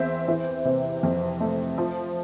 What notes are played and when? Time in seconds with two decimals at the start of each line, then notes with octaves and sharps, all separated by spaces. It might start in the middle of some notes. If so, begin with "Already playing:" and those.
Already playing: E2 C4 C5 E5
0.28 E3
0.65 C3
1.03 F2
1.40 A3
1.78 F3